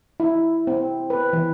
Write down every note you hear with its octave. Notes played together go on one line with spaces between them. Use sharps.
E4
C4
B4
E3